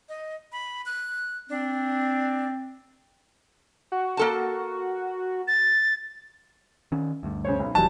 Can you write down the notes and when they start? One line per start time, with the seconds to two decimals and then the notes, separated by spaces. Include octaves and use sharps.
0.09 D#5
0.52 B5
0.86 F#6
1.49 C4 D4
3.92 F#4
4.17 A#3 A4 A5
5.48 A6
6.92 D#3 C#4
7.23 D2 G2
7.45 C#3 C5 C#5
7.59 B1
7.75 E1 D#2 E3 F#3 G3 A5